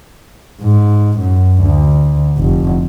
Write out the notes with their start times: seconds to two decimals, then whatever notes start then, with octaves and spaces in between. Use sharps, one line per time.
0.62 G#2
1.19 F#2
1.63 D2
2.38 F1